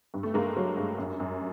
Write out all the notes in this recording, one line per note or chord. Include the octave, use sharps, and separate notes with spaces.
G2
A3
G2 G#3 A#3
F#3
G2
F#2
F#2